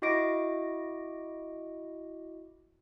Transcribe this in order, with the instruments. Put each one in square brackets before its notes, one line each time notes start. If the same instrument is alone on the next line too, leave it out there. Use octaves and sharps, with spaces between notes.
[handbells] E4 F#4 D#5 D6 A#6 D7